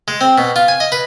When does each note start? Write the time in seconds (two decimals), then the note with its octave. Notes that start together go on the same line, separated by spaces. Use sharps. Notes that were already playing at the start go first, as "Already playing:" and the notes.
0.08 G#3
0.21 C4
0.38 B2
0.56 F4
0.68 G#5
0.80 D#5
0.92 B4